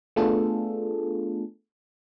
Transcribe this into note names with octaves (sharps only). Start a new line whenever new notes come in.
A3 B3 D4 F4 G#4 A4